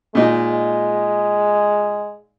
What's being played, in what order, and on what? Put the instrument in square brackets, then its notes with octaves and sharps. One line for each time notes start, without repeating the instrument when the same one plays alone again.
[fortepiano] A#2 D#4 [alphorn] G#3